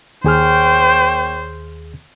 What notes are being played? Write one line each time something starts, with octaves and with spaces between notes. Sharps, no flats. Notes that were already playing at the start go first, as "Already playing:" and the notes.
D#2 A#3 G#4 C5 C#5 G5 F6